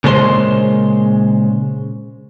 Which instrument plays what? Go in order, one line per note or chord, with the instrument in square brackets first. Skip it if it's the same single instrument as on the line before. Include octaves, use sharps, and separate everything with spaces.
[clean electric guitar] A#2 C#3 G#3 A4 C5 C6